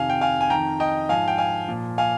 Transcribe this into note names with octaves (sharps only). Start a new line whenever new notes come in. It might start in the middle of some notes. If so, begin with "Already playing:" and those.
Already playing: F2 C3 D#3 F5 G#5
G5
F5 G#5
G#5
F2 D#3 G5 A#5
D#5 G5
G#2 F3 F5 G#5
G5
F5 G#5
A#2 F3
F5 G#5